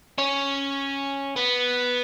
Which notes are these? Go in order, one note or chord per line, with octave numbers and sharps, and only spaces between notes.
C#4
B3